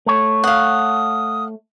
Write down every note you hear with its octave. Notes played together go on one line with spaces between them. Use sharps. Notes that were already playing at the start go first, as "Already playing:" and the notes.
A3 C#5
F5 F#5 D#6